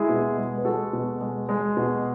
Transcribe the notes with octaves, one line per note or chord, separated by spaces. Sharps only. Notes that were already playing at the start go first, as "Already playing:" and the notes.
Already playing: G#3 E4 G#4
B2
G#3
B4
G#3 F#4 A4
B2
G#3
G#3
B2